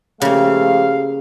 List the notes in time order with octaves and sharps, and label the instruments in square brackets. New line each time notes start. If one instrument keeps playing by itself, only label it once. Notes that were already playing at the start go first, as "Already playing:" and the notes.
[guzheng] C#3 A#3 [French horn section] F3 A3 G4 [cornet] F5